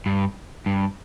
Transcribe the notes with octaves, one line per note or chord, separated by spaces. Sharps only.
G2
G2